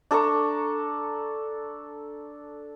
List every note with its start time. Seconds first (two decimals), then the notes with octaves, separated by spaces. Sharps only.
0.11 D4 A4 A#5 C#6